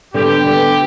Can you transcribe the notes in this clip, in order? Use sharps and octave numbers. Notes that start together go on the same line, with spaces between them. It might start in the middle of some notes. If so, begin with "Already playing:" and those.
D3 G3 B3 G4
D3 G3 B3